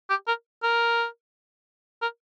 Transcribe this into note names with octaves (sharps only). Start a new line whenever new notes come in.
G4
A#4
A#4
A#4